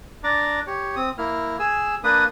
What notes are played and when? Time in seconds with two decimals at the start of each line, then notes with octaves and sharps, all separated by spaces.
0.24 D4 D5 A#5 D6
0.67 G4 C#5
0.96 C4 D#6
1.18 A#3 E4 F6
1.60 G#4 G#5 E6
2.04 A#3 D4 B4 D#6